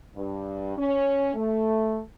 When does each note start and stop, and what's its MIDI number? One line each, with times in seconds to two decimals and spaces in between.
0.16 0.75 43
0.76 1.31 61
1.35 1.99 57